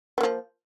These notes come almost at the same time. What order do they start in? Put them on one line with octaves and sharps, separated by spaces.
B3 A#3 F3